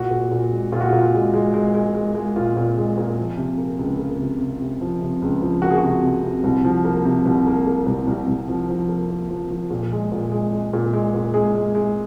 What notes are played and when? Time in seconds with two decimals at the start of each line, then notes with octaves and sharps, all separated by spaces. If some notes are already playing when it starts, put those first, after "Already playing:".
Already playing: A#2 F#4
0.11 A#2
0.31 A#2
0.51 G#3
0.72 A#2 F4
0.80 F#4
0.89 A#2 F4
1.14 G#3
1.33 G#3
1.54 G#3
1.74 G#3
1.95 G#3
2.15 G#3
2.36 A#2 F4
2.57 A#2
2.77 G#3
2.98 A#2
3.18 F3
3.37 C3
3.58 A#3
3.79 C#2
3.99 A#3
4.20 C3
4.40 C3
4.60 C3
4.81 F3
5.01 C3
5.22 C#2
5.42 F3
5.62 A#3 F#4
5.70 G#4
5.78 F#4
5.83 C3
6.03 C3
6.23 C3
6.44 C2
6.64 F3
6.85 A#3
7.05 C3
7.25 C2
7.46 A#3
7.67 A#3
7.86 C2
8.07 C2 A#4
8.28 C2
8.48 F3
8.69 F3
8.89 A#3
9.09 A#3
9.30 F3
9.50 F3
9.70 A#2
9.92 G#3
10.12 A#2
10.31 G#3
10.52 G#3
10.73 A#2
10.93 G#3
11.14 A#2
11.34 G#3 G#4
11.55 G#3
11.75 G#3